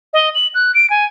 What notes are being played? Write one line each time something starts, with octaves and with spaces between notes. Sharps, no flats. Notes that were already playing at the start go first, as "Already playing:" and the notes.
D#5
F#7
F#6
D7
G#5